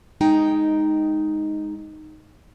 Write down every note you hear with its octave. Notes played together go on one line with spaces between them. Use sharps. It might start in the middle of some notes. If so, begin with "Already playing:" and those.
G#3 D#4 G5